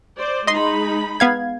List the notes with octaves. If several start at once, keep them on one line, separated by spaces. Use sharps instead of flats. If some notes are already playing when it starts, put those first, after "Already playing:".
C5 D5
G#3 D#4 D#5 B5 C6
B3 F5 G#6